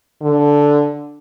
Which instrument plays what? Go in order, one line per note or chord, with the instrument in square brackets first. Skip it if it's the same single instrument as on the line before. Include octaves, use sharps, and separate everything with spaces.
[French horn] D3